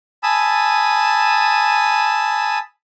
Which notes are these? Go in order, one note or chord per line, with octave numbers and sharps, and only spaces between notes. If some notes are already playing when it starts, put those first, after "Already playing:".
G#5 A5 B5 D#6 E6